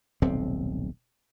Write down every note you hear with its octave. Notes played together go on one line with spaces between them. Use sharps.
D#1 B1 C3 C4